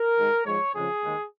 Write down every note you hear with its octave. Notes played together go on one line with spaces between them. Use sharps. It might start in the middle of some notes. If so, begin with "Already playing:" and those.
Already playing: A#4
G#2 D#3 G#3
G#2 F3 G#3 C#5
F2 C#3 F3 G#3 G#4
D#2 D#3 G#3